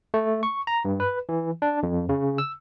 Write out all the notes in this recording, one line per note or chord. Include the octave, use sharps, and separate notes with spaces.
A3
C#6
A#5
G2
B4
E3
D4
F2
C#3
E6